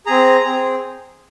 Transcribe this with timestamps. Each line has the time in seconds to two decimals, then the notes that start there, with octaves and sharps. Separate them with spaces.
0.06 C4 G#4 A#5
0.44 C4 G#4